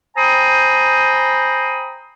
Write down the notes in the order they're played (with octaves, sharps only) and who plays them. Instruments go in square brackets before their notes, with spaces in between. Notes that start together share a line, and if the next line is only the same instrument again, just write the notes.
[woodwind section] C5 G5 G#5 A#5 B5 D#6